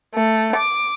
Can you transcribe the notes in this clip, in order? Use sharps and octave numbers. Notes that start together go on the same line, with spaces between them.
A3
D6